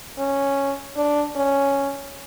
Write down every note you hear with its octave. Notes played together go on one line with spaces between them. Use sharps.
C#4
D4
C#4